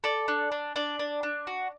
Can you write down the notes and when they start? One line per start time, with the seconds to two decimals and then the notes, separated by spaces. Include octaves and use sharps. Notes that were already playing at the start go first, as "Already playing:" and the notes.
0.04 A4 D5
0.28 D4
0.52 D4
0.76 D4 D5
0.99 D4
1.23 D4
1.47 F#4